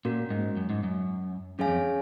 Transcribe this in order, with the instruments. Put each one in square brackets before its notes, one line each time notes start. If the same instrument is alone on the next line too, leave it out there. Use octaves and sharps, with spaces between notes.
[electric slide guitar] A#2 [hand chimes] C#4 F#4 A#4
[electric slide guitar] G#2
F#2
G#2
F#2
[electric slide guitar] F#2 [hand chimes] C#4 G#4 C#5 F5 G#5
[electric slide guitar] F2